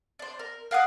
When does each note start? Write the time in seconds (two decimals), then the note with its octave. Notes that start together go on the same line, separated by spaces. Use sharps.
0.19 D4 C5
0.39 A#4
0.71 A#4 F5 F#5 D#6